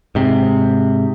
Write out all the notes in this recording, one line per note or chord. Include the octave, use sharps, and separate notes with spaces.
G#2 C3